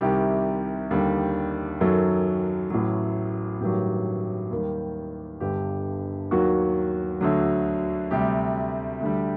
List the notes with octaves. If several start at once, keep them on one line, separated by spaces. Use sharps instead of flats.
C2 C3 D#3 G3 G4
D#2 D3 G3
F#2 D#3 F#3 A4
A1 A2 F#3
A1 G2 D#3 F#3 G4
D#2 D#3 G3
G1 G2 D3 G4
D#2 D#3 F#3 F#4
D2 D3 F#3
D2 C3 G3 G4
D2 D3 G3